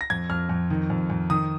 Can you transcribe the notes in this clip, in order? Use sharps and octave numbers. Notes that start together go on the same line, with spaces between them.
A#6
F2 G#6
F2 F6
F2
D#3
F2
F2
D#3 D#6